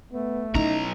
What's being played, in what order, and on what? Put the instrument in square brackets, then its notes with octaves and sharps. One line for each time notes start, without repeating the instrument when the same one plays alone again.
[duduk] A3 [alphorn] B3
[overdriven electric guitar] B1 A#5 [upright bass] C#4 E4 [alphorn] D#4